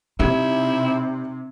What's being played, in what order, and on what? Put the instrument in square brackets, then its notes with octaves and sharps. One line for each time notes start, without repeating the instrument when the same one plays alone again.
[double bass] C3 [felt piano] G3 G4 G#6 [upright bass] D#4 [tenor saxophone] E4